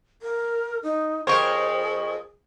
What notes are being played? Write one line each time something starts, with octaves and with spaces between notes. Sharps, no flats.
A#4
D#4
F2 G#4 A#4 C5 C#5 C#6